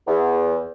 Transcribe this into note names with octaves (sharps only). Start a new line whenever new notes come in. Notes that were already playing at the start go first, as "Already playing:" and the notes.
E2